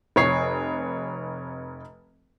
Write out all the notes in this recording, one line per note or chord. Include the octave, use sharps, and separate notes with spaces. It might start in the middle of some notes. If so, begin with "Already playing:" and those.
F1 C#5 C7